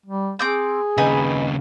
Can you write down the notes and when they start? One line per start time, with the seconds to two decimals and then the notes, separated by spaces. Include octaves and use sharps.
0.06 G3
0.39 C4 G#4 D6 G6
0.98 D#2 C#3 D#4 B4 G#5